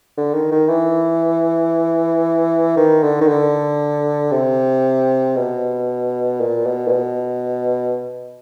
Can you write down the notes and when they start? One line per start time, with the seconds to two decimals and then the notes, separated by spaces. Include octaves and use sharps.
0.17 D3
0.34 D#3
0.52 D#3
0.69 E3
2.77 D#3
3.03 D3
3.21 D#3
3.28 D3
4.32 C3
5.36 B2
6.41 A#2
6.66 B2
6.87 A#2
6.92 B2